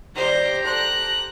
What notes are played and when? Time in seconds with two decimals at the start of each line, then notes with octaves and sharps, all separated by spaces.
0.16 D#3 G3 G4 C5 D5 A#5
0.65 A4 C5 F#6